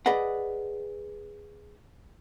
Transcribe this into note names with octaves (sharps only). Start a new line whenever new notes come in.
G#4 B4 D5 D#5 F#5